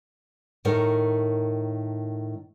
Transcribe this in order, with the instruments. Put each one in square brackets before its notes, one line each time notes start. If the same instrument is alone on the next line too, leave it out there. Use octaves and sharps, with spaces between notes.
[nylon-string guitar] A2 D#3 A#4 C#5